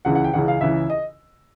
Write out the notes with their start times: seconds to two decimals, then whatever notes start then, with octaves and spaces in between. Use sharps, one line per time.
0.05 C#2 C#3 E3 F#5
0.15 F#5
0.24 G5
0.33 C#2 C#3 E3 F#5
0.48 F5
0.61 C#2 C#3 E3 E5
0.90 D#5